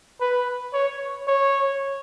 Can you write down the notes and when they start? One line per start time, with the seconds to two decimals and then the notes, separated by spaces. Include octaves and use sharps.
0.21 B4
0.74 C#5
1.27 C#5